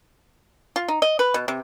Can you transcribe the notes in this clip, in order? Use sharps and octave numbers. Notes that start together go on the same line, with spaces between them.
F4
D#4
D#5
B4
B2
C3